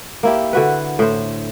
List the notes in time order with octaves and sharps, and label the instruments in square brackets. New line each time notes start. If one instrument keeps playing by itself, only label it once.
[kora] A#3 E4 G4
D3 F#4 B4
A2 C5